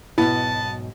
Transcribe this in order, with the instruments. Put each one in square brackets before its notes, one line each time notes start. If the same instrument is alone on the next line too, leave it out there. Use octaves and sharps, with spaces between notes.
[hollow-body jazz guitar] B1 G#2 B2 [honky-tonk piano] B3 [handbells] E4 [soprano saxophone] A5